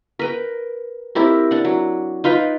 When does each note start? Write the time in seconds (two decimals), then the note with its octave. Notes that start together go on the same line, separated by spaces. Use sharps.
0.19 A#4 B4 G5
1.15 C4 E4 G4 A#4
1.51 D4 F#5
1.65 F#3
2.24 D#4 F4 B4 G5